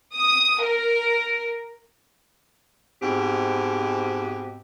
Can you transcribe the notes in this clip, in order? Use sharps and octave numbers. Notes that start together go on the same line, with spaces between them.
D#6
A#4
G#2 B2 C4 G4